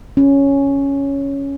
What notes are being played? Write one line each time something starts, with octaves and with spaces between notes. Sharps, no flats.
C#4